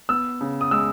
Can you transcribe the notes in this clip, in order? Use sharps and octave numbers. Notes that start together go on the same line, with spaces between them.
B3 E6
C#3
D#6
G#3 E6